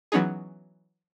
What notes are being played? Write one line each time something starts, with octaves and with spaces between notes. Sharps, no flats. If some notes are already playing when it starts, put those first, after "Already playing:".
E3 F#3 B3 C#4 D#4 G#4